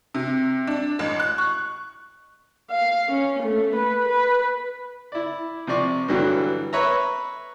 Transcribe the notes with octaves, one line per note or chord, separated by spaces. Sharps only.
C3
D4
A1
F#6
C#6
F5
C#4
A3
B4
B4
E4 D5
C3 F3 D5 C#6
G2 D3 E3 F#3 G3
B4 C#5 E5 A#5